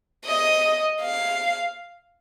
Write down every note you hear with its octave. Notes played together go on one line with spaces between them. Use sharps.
D#5
F5